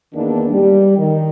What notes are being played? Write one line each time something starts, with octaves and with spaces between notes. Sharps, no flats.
E2 D#3 A#3 D4
G3
D#3